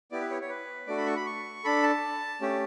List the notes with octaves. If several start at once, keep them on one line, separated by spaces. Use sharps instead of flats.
B3 E4 G4 D5
B4
C#5
C#5
B4
A3 D4 F#4 A4 D5
B5
C#6
B5
C#6
D4 A4 B5
A5
A3 C#4 G4